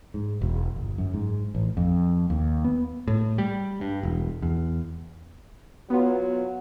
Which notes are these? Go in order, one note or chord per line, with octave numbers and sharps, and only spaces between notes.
G#2
E1
G1
F#2
G#2
A1
F2
D#2
B3
A2
G3
G2
E1
E2
F#3 B3 F4